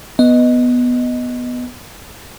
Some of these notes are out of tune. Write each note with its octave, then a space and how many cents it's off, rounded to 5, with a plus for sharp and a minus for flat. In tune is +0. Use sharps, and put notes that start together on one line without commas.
B3 +0 D#5 +0